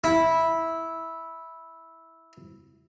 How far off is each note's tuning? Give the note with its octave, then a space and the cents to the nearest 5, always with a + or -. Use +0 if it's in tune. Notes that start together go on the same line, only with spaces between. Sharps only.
E4 -10